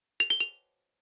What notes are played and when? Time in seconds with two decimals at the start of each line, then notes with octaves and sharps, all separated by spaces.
0.20 F7
0.30 G7
0.40 F7